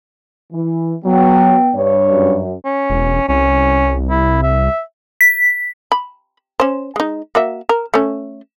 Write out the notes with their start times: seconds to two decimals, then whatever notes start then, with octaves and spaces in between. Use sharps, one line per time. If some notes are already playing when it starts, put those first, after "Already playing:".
0.53 E3
1.05 F#3 B3 G5
1.75 G2 C#5
2.11 F#2
2.65 C#4
2.90 E1
3.29 C2 C#4
4.10 E4
4.43 E5
5.21 B6
5.92 B5
6.60 C#4 C5
6.96 G#3 D#4
7.35 A#3 F#4 E5
7.69 A#4
7.94 A3 C#4